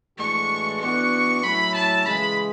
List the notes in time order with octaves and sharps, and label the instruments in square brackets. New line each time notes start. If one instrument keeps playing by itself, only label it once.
[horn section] A2 E3 G#3 D4 F#4 [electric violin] C#6
[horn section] E3 B3 D4 F#4 [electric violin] C#6
[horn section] A2 F#3 C#4 E4 [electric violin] B5
[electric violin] A5
[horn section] C#3 E3 G#3 [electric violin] B5